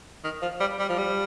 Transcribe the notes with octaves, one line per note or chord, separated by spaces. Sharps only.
D#3
F3
G3
G3
F3
G3